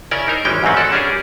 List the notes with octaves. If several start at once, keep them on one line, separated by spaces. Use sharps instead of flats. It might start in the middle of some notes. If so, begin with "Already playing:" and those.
C#3 C#4 E4 A#4 D5
D#4 A#4 C5
G#1 E3 G3 G#3 C#4 G5
E2 G#2 F#3 C4 C#4
F#4 A4 D5
G3 C#4 D4 G#4 A#4